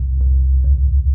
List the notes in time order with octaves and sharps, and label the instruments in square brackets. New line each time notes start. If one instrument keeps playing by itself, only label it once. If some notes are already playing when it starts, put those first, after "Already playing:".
Already playing: [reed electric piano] C2
C2
D2